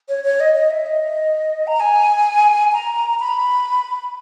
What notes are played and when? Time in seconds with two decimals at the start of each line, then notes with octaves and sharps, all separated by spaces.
0.08 C#5
0.24 C#5
0.40 D#5
0.55 D#5
0.70 E5
0.86 D#5
1.67 A#5
1.80 G#5
2.73 A#5
3.20 B5